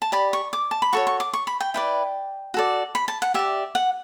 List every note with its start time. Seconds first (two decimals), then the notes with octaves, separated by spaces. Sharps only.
0.02 A5
0.12 G4 D5 B5
0.33 C#6
0.53 D6
0.71 A5
0.82 B5
0.93 F#4 A4 C#5 C#6
1.07 C#6
1.20 D6
1.33 C#6
1.47 B5
1.60 G5
1.74 E4 B4 D5 G5
2.54 F#4 A4 D5
2.95 B5
3.08 A5
3.22 F#5
3.34 G4 D5 E5
3.75 F#5